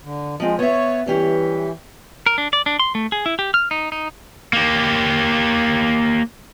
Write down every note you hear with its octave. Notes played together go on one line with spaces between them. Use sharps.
D3
F3 G#3 C4
B3 C#5 E5
E3 G3 C#4 G4
A#4
D4
D5
D4
C6
A3
G#4
E4
G4
F6
D#4
D#4
A#3 G4